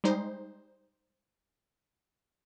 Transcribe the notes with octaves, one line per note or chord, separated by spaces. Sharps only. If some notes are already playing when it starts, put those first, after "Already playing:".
G3 G#3 D#4 C5